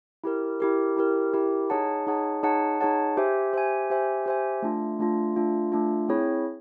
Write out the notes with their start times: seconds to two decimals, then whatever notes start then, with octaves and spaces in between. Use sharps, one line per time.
0.24 E4 G4 A#4
0.60 E4 G4 A#4
0.97 E4 G4 A#4
1.34 E4 G4 A#4
1.70 D#4 G#4 C#5 F#5 A5
2.07 D#4 G#4 C#5 F#5 A5
2.43 D#4 G#4 C#5 F#5 A5
2.81 D#4 G#4 C#5 F#5 A5
3.17 G4 C5 E5 G#5
3.53 G4 C5 E5 G#5
3.90 G4 C5 E5 G#5
4.26 G4 C5 E5 G#5
4.62 A3 D4 F4
4.99 A3 D4 F4
5.36 A3 D4 F4
5.72 A3 D4 F4
6.09 C4 E4 G#4 C#5